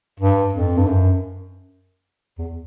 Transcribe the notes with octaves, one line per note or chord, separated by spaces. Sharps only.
G2
F2
G2
F#2
E2